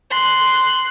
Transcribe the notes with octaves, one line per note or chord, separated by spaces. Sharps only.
C6 F#6